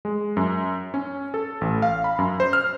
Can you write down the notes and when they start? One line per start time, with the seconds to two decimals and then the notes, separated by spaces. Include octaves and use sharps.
0.05 G#3
0.37 F#2
0.94 C#4
1.34 A4
1.61 A1
1.82 F5
2.04 B5
2.19 F#2
2.40 C5
2.53 F6